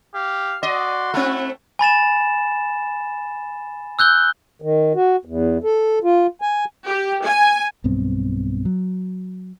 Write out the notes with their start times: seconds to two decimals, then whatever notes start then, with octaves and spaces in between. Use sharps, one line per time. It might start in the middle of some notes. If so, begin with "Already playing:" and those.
0.14 G4 F5
0.63 F#4 D5 D#5 C6
1.14 A3 C4 E4 F#5
1.79 G#5 B5 A6 E7
3.99 E6 F#6 G6 G7
4.62 D#3
4.95 F#4
5.25 E2
5.64 A4
6.04 F4
6.41 G#5
6.87 G4
7.25 G#5
7.84 B1 G2 B3 C4
8.65 F#3